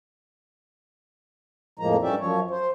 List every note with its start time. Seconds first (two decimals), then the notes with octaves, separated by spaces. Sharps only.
1.79 F2 A2 F3 G#3 A#3 A#5
2.02 G2 C#4 G4 D5 E5
2.19 F#2 F3 C#5
2.51 C5